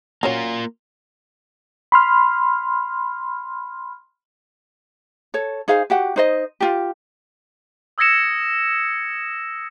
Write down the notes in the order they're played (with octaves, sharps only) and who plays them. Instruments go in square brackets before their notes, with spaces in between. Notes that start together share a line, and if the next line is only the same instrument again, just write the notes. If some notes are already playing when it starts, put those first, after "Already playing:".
[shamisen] F#3 C#4 C#5 [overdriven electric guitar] A#3 F4
[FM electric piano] B5 C6 F6
[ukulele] A4 C#5
D#4 G#4 C5 F5
F#4 G4 F#5
D#4 C5 D#5
F4 G4
[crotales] D#6 E6 G#6 A#6 C#7 E7